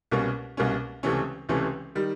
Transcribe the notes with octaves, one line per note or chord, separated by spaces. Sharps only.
C2 B2 G3 A#3 C#4
C2 B2 G3 A#3 C#4
C#2 C3 E3 A3 C#4
C#2 C3 E3 A3 C#4
D#3 G3